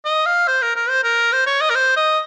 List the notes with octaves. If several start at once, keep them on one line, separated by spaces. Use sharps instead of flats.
D#5
F5
C5
A#4
A#4
C5
A#4
C5
C#5
D#5
A#4
C5
D#5